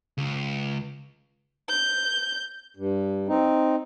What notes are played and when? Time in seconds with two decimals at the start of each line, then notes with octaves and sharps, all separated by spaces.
0.18 C#2
1.69 G6
2.77 G2
3.28 C4 D#4